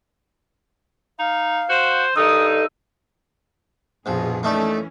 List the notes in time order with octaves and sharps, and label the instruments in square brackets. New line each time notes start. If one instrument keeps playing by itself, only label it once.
[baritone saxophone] D#4 [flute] F5
[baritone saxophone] F#4 [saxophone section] C5
[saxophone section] G2 D#4 [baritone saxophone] D#3 [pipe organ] A4 [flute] D#6
[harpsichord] A#1 F3 [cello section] F2 B2 G#4
[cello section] E3 C#4 [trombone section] A3 [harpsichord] A#3 D#4 D5